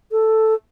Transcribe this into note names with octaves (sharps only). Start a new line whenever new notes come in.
A4